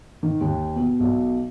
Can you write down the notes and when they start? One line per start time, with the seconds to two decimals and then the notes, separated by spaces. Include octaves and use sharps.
0.23 D#3
0.41 D#2
0.76 B2
1.00 B1